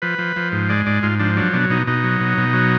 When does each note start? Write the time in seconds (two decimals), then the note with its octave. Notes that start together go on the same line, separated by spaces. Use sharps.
0.02 F3 B4
0.19 F3
0.36 F3
0.52 G#2
0.69 G#3 D5
0.86 G#2 D5
1.03 G#2 F4
1.19 F3 D4
1.37 F#3 D4
1.53 B2 D4
1.70 B2 D#4
1.87 B2 D#4
2.03 F#3
2.21 B2
2.38 B2
2.53 F#3